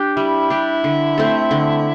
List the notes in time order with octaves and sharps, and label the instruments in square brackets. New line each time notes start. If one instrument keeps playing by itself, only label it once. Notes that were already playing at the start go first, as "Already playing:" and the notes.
Already playing: [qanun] D4 G4
[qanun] G3 [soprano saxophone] E4
[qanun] D4 G4
D3
A3 C4 A4
D3